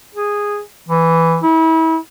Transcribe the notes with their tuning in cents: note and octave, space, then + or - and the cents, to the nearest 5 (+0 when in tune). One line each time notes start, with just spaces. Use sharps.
G#4 -10
E3 +5
E4 -35